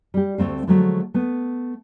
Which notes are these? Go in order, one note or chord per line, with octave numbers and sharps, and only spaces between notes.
G3 G4
D2 C3 A3 C4 F5
D3 F3 F#3 G#3 A3
A3 B3